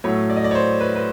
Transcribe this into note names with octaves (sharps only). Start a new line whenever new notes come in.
A2 F#3 A3 C#5
D5
D#5
D5
C#5
C5
B4
B4